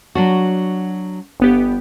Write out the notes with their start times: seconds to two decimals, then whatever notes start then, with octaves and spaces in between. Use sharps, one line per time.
0.15 F#3 D4 F#4
1.40 G1 B3 G4